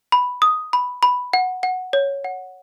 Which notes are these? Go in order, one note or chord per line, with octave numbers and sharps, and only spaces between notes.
B5
D#6
B5
B5
F#5
F#5
C#5
F#5